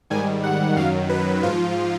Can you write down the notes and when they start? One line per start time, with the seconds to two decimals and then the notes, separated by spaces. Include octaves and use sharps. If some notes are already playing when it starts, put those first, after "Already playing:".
0.10 G#2 D#3 G3 G#5
0.44 F#5
0.77 F#2 D#3 F#3 F5
1.09 B4
1.43 G#2 F3 F4